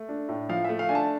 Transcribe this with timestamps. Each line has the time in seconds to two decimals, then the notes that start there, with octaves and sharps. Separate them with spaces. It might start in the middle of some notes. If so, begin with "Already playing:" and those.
Already playing: A3
0.09 D4
0.29 A2
0.49 F3 F5
0.64 A3 E5
0.79 F5
0.89 D4 G#5
0.95 A5